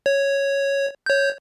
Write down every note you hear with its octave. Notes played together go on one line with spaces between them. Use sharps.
C#5
C#5 G6